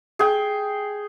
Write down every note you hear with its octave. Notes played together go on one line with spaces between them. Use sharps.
G#4 G5